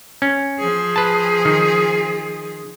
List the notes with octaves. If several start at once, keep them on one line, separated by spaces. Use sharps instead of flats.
C#4
F3 G#4
B4 A5
D#3